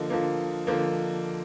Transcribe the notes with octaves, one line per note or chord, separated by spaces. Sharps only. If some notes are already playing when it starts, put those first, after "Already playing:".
Already playing: D3 F3 A#3 D#5
D3 F3 A#3
D3 F3 A#3